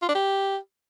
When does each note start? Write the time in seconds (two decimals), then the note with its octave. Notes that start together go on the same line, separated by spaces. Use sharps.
0.02 F4
0.08 D4
0.15 G4